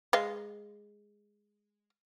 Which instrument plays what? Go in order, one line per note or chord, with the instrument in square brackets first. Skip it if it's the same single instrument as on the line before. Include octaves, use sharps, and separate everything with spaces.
[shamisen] G#3 D#5 F5